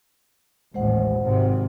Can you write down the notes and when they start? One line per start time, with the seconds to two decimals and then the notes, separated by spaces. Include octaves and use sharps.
0.74 A1 D#2 G#3 C5 F#5
1.20 G#1 C3